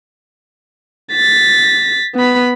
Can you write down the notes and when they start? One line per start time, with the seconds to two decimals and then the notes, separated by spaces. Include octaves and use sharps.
1.12 A6 B6
2.15 B3 B5